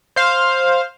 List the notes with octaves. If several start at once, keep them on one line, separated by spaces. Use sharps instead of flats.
C5 F5